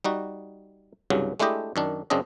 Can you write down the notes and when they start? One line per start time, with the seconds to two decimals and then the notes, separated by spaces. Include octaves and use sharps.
0.04 G3 D#4 F#4
1.10 C2 G2 C#3 F#3
1.40 G#3 A3 D4 E4 G4 D#5
1.76 F#2 D#3 D4
2.10 F#2 C#3 C4 D4 D#5